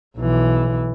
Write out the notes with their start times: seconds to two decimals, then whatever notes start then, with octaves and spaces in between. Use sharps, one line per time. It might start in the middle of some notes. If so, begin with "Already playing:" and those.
0.17 B1 E3